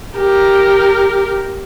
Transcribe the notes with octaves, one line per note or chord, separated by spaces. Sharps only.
G4 A#4